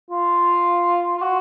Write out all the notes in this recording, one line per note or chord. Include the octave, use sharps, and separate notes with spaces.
F4
F4
F#4